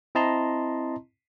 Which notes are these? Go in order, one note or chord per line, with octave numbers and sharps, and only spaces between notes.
C4 E4 D#5 A5 A#5 C6